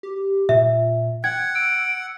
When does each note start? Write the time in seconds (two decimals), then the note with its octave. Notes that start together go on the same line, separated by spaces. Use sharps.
0.03 G4
0.49 A#2 E5
1.24 F#5 G5 G#6
1.55 E6 D7